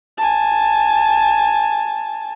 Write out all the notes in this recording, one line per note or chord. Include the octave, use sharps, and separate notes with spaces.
G#5 A5